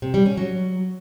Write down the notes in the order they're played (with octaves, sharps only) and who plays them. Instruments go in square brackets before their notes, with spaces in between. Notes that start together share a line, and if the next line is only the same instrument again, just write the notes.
[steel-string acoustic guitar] C3
G3
C#4
F#3